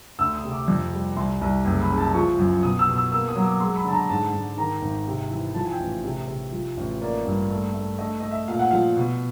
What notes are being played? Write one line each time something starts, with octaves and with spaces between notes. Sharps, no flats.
D2 E6
D#6
C3
D6
F2
G3
C2 C6
C2
F#1
B5
C#3
A5
F3 C#6
F#2
B2 D#6
E6
B2
E6
A#3 E6
D#6
F#3
D6
G#3 C6
B5
D3 A5
A#5
G#2 A5
G#2
D#3 A#5
G#1
C3
E3
F3 A5
G#5
G5
A1
C3
C3
F3
A1
A#3 D5
G2
A3
A3
A3 D#5
A3 D#5
E5
A#2 F5
F#5
F3 F5
B2